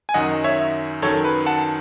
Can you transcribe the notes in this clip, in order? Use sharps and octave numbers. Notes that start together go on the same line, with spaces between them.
G#5
F#2 D#3 F#3 D#5 F#5
C#5 E5
F#2 D#3 F#3 A4 C#5
B4
F#5 A5